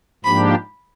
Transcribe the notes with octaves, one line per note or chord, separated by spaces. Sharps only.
G#2 F3 A#3 D4 G4 B5